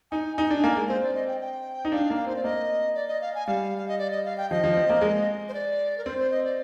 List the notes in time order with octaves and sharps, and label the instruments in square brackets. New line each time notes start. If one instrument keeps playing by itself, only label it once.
[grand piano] D#4 [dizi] G#5
[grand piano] D#4 [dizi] G#5
[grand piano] D4
A#3
G#3
[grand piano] C4 [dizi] C5
[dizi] D5
D#5
G5
G5
[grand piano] D#4
[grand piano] D4 [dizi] F5
[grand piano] A#3
[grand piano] C4 [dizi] C5
[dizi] D5
[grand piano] A#3 [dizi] D#5
[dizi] D5
D#5
F5
G#5
[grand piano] G3 [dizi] F5
[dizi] F5
D#5
D5
D#5
F5
G5
[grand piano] F3 [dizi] D#5
[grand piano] F3
C4
A#3
G#3
[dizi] C5
D5
A#4
[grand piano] C4 [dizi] C5
[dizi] C5
D#5
D5